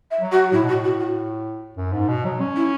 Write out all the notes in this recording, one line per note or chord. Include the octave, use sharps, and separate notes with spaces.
E5
F#3
F#4
A2 E4
B2 F#4
A2
F#4
F#4
F#2
G#2
B2
F#3
C#4
E4